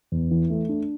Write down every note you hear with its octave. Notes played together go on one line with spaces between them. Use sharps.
E2
E3
A3
D4